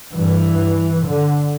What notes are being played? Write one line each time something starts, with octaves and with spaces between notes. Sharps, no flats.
G2 E3
D3